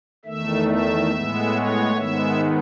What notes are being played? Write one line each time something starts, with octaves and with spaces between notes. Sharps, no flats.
E2 D#3 A3 E5
E5
A2 G#3 B3
C#5
G#2 D#3 G#3 B3 E5